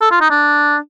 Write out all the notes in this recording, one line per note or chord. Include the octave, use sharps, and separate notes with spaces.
A4
F4
D#4
D4